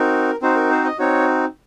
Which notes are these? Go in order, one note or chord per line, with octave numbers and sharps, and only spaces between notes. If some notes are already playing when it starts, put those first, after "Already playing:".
Already playing: C4 D#4 F#4 A#4
C4 D#4 F#4 C5
A#4
C5
D#5
C4 D#4 F#4 C#5